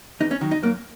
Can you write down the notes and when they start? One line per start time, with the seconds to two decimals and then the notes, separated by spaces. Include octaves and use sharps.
0.20 E2 D#4
0.31 C#4
0.41 D#3 F#3
0.51 D#4
0.63 F#2 A#3